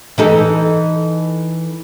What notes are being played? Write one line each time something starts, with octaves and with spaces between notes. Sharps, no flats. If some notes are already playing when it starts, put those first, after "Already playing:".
E3 D#4 A4